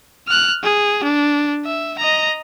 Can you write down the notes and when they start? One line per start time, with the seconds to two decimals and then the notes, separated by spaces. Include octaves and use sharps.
0.28 F6 F#6
0.63 G#4
1.04 D4
1.65 E5
1.98 D#5 A#5